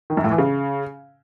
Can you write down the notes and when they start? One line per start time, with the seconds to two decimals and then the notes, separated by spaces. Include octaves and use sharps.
0.10 D#3
0.17 F#2
0.24 A2
0.31 E3
0.38 C#3